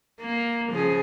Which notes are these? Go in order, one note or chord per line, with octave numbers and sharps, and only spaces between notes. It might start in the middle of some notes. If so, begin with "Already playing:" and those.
A#3
C#3 F3 G#4